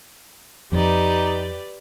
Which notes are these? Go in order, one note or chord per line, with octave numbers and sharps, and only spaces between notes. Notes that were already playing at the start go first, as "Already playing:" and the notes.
F2 F3 D#4 G4 B4 D5